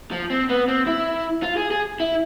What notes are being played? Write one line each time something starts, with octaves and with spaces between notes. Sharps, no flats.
F3
C4
B3
C4
E4
F4
G#4
G#4
E4